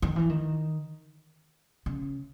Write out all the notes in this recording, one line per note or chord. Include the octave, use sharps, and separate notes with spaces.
D#3
E3
D#3
C#3